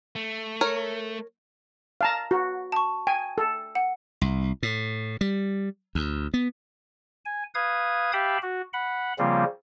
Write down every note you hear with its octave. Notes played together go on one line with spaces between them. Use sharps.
A3
A#4 C#5
F5 A5 A#5
F#4
A5 C#6
G5 G#5
A4
F#5
C2
A2
G3
D2
B3
G#5
B4 F5 D#6 G#6
G4 E5 F5 G5 A5 B5
F#4
F#5 B5
C#3 F3 G3 A#3 C4 F4